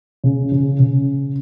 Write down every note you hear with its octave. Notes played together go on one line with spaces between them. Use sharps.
C#3
C#3
C#3